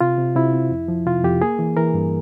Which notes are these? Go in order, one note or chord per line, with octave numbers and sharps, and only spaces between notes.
C3 F4
C3
C3 E4
C4
F2
F3
C3 F4
F2 G4
A#3 G#4
E3
E3 A#4
G2